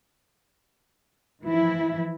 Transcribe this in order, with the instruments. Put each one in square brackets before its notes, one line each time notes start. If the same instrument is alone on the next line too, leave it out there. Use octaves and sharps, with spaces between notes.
[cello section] E3 F3 E4